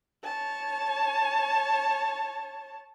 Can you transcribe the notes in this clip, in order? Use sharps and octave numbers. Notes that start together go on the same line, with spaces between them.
C#5 A5